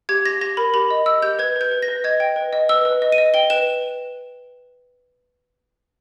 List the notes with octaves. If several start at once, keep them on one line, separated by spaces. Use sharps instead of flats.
G4 G#6
G4 A#6
G4 A#6
A#4 B5
G4 B5
D#5
D#5 E6
G4 G6
B4 G#6
B4 G6
B4
A#6
B4
D#5 G#6
G5
B4
D#5
B4 E6
B4
D#5
D#7
D#5
G5 G7
B4 E7